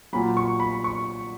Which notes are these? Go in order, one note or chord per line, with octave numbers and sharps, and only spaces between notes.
A#2 F#3 B5
C#6
B5
C#6